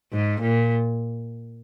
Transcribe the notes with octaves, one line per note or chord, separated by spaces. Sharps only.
G#2
A#2